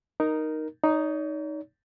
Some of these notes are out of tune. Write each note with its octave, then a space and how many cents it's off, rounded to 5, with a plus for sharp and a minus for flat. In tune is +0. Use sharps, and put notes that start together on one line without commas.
D#4 -5 A#4 +5
D#4 +0 C#5 +45